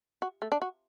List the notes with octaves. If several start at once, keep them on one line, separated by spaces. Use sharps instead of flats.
F#4
A3
D4
F#4